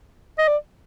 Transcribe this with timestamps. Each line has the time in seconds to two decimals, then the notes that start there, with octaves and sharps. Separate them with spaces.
0.39 D#5
0.48 D5